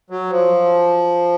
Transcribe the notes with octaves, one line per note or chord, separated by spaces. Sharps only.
F#3
F3